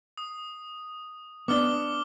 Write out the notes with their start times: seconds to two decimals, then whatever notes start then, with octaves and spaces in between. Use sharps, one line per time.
0.17 D#6
1.48 B3 D4 D6 F6 G7